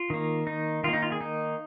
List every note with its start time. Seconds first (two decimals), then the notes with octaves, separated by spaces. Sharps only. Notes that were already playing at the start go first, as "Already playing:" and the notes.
Already playing: F4
0.10 D#3 A#3
0.47 D#4
0.84 D#3 F4
0.88 A#3
0.93 D#4
1.02 F4
1.12 G#4
1.21 D#4